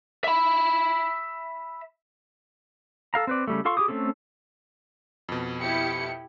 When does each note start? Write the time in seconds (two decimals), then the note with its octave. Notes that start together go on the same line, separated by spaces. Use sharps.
0.24 E5 B5
3.14 A4 F5 A#5
3.27 C4 B4 D5
3.48 C#3 G3 A3
3.65 F4 A4 F5 C6 C#6
3.77 G4 G#4 D6 D#6
3.88 A3 A#3 C4 C#4 A4
5.29 F2 B2
5.61 E4 G4 C#7